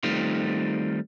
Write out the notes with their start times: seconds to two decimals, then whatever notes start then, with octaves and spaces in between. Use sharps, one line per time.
0.03 D#3 G3 A3 C4 D#4 F4